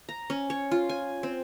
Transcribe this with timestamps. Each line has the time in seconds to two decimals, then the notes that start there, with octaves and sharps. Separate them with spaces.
0.09 A#5
0.30 C#4
0.50 C#5
0.71 F4
0.89 G#5
1.23 C4